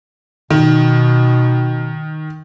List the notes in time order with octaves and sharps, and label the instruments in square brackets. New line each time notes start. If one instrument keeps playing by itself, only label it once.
[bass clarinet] B2 [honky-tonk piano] D#3